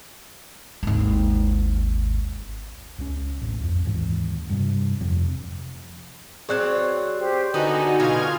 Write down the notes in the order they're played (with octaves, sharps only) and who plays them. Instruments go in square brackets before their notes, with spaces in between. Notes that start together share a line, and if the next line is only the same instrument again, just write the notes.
[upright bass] G#1 D#2
[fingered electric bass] C#2 C#4
A1 D2
F2
D#2 G#2 E3
G2 C3
F1 F2 C3
[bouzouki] F#3 C4 C#5 [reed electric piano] G#4 D5 F#6
[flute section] G4 C5
[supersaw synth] D3 D#4 F#4 [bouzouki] B3 [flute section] G#5
[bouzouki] B2 B3 [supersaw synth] F4 F6 G#6